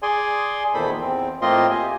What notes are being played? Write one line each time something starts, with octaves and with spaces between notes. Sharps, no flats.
G#4 D5 G#5 C6
E2 A#2 D#3 A4 C5 B5
E2 C4
A2 A#3 C4 F4 D#5 C6
G4 G#5